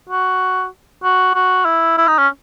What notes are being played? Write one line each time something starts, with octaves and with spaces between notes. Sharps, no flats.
F#4
F#4
F#4
E4
E4
D#4
C#4